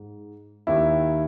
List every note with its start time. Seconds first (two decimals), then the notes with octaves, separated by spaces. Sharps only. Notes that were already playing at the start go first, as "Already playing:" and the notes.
Already playing: G#2
0.67 D#2 D#3 E4